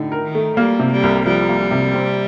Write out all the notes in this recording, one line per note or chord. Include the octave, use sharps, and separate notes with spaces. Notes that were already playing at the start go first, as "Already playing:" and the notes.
Already playing: A2 D3 D#4
A#4
D#3
A3
G3 A#3
C3
G3
C2
F3 G3
A#3
C3
C4